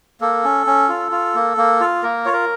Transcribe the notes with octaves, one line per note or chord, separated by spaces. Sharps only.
A#3 A4
C#4
C#4
F4
F4
A#3
A#3
F4
A#3 A#4
F4 C#5
A#4